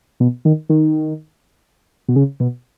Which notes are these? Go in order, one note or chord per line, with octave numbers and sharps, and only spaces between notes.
B2
D#3
D#3
B2
C#3
B2